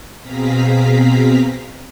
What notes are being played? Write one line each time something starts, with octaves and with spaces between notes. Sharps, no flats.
B2 C4 G#4 F5 A#5 B6